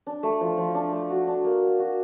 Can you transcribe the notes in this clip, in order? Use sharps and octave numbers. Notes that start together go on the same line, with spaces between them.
D4
A3
F3
F3
D4
A3
F#4
D4
A#3
A#3
F#4